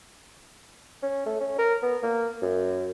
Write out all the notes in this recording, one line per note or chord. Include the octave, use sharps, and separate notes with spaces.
C#4
A3
C#4
A#4
B3
A#3
F#2